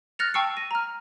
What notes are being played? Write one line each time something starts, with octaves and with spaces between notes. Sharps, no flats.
F6 F#6 A6 A#6 C#7 F7
G5 A5 C#6 E6 C7 C#7
A#6 D#7
A#5 F6